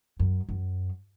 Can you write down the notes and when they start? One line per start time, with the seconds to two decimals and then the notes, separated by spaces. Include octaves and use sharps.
0.19 F#2
0.49 F#2